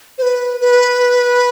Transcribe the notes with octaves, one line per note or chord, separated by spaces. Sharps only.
C5
B4
B4